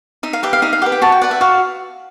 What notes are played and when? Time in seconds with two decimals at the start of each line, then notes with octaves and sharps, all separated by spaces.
0.23 D#4 E5
0.33 F5
0.43 G4 B4 E5
0.53 F5
0.62 D#4 E5
0.73 F5
0.82 G4 F#5
0.86 B4
0.92 G5
1.02 F#4 A5
1.12 G5
1.22 B4 D5 F#5
1.31 E5
1.41 F#4 F5